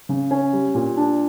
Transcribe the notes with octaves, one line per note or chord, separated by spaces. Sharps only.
C#3
C#4
G3
A#2
D4